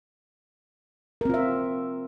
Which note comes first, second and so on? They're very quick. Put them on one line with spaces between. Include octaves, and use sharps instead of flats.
A#4 C4 F4 E5